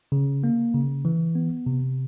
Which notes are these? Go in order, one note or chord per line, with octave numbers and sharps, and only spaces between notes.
C#3
A#3
C#3
E3
B3
C3